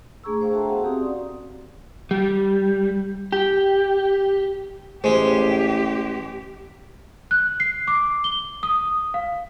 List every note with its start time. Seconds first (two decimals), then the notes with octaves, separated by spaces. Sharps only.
0.24 A3 D4 G#4 A#5 C#6 E6
0.40 G#4 C5 F5 G5
0.53 F#4 A4 E5 A5 A#5 C6
0.68 B3 F#4 G#4 F5 F#5
0.84 C4 F#4 G4 F5 C6 D#6
1.01 C#4 D5
2.11 G3
3.32 G4
5.04 A1 G#3 G4 C5
7.31 F#6
7.60 C7
7.88 D6
8.24 G7
8.63 D#6
9.14 F5